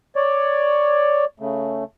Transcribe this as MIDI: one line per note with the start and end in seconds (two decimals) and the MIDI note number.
0.16 1.25 73
0.16 1.25 74
1.40 1.84 49
1.40 1.84 57